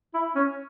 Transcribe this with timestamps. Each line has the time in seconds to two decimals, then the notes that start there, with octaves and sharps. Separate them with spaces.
0.14 E4
0.35 C#4